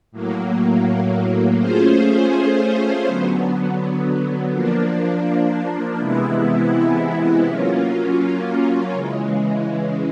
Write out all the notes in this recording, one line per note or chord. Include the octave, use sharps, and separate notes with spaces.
A2 F#3 A#3
A3 C#4 F4 G#4 C5
D3 F#3 B3
F3 A#3 D4
C3 E3 G#3 B3 E4
F#3 A#3 C#4 F4
C#3 E3 G#3